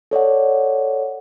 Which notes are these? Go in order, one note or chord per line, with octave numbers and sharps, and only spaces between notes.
A4 C#5 D5 F#5